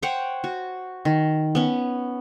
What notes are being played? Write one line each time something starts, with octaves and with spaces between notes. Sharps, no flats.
C5 C#5 F#5 G5
F#4
D#3
B3 C#4